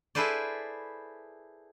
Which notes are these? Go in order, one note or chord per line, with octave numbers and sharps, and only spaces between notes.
E4 G#4 A4 B4 C5 D5